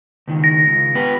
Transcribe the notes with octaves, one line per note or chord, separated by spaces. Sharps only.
C#2 D#3
A#6
C#2
B3 G4 B4